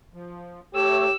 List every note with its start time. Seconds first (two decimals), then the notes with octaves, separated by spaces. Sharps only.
0.14 F3
0.74 A3 G4 A4 C#5 E6